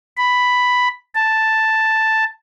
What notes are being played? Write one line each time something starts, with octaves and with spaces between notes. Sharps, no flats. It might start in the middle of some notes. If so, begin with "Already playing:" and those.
B5
A5